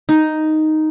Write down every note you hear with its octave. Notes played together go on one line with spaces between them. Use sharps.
D#4